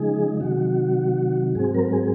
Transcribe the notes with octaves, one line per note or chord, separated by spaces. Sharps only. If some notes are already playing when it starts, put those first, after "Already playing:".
Already playing: C#3 F3 G#3 D#4 G#4
C3 D#3 F#3 F#4
G#2 F#3 C4 G#4
A#4
G#4